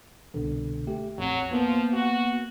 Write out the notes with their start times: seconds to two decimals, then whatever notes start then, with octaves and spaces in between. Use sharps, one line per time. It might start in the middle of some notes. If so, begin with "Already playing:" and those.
0.34 C2 B2 D3
0.87 A3 G4
1.18 A#1 F2 F#3
1.51 F3 A#3 B3
1.93 F#4